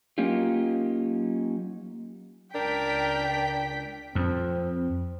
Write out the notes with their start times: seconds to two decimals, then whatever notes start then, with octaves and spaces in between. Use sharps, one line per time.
0.18 F#3 A#3 C#4 D#4 F4 G4
2.55 C#2 D4 A#4 G5 B6
4.15 F2 C4